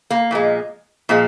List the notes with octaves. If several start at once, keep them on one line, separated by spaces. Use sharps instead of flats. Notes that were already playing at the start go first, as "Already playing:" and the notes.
A#3
A#2 F3 G#3
A#2 F3 G#3